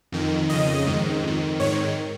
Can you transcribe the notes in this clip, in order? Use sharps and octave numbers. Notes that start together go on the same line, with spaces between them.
F2 D#3
F2 C#3 D#5
G#2 D#3
F2 D#3
G#2 D#3 C#5